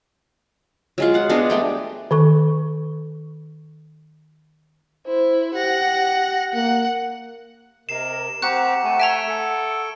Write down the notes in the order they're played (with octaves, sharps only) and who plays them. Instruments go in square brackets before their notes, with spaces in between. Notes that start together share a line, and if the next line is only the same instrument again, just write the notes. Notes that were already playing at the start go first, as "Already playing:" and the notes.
[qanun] F#3 G#3 F4
F5 F#5
G#3 B3 D4 F#4
G3 A3 G5
[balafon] D#3 A4 C#6
[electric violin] E4 [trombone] C5
[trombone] G4 [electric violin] F#5 A#6
[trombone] A#3 [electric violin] F#5
[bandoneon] C3 [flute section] A#4 D#5 [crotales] C7 E7
[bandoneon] C4 G4 [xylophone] F#5 F#6 [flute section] A#5 [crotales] C#6 C#7
[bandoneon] A3 [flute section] F#5 G#5
[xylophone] E5 A5 A#5 [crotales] E6 G#6 D7
[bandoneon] A4 [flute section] F#5